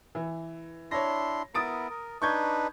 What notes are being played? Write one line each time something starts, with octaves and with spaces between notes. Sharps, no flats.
E3
D4 E4 C#5 C6 A#6
B3 E4 A#4 D#6 A6 D7
A#4
D4 D#4 B4 C#6 G6 G#6